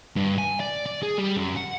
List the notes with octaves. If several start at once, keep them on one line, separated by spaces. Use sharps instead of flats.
G2
G#5
D5
D5
G#4
G3
F#2
F#5